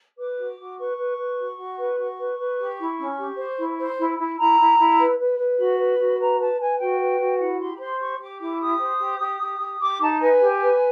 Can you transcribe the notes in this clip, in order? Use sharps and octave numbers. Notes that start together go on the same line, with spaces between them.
B4 D6
F#4
F#4
B4 C#6
B4
B4
F#4
F#4
B4
F#4 C#6
B4
B4
G4
E4
C#4
G4
C5
E4
C5
E4
E4
E4 A#5
E4
E4
B4
B4
B4
F#4 B5
B4
F#4
B4 A#5
B4 A5
B4 G#5
F#4 G5
B4
F#4
E4 F#5
G4 C6
B5
C5 C6
G4 C#6
G4 D6
E4 D6
G4 D#6
C5
G4
G4
G4
G4
G4 D6
D#4 A5
B4 G#5
G4
B4